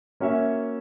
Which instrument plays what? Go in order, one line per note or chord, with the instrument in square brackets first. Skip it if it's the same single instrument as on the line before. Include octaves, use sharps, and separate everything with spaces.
[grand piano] A#3 C#4 F#4 C#5 E5